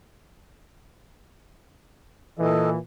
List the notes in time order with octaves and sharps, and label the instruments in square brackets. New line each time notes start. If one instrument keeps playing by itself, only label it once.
[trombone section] A#2 E3 [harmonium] A4 D#5